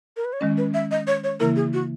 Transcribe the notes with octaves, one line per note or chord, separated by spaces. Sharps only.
A#4
B4
C#5
D#3 G#3 C#4 D#5
B4
E5
D#5
C#5
C#5
C#3 E3 A#3 E4 A#4
G#4
F#4